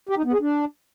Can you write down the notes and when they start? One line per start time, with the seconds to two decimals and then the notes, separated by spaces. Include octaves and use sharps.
0.09 G4
0.17 D#4
0.25 B3
0.33 G#4
0.41 D4